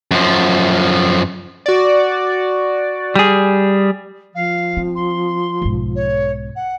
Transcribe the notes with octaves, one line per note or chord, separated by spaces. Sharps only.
F#2 F3
F#4 D5
G3 G#4
F3 F5
C4
C6
B1 G#2
C#5
F#5